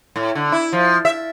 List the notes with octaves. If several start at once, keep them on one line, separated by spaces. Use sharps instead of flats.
A2
D3
E4
F3
E5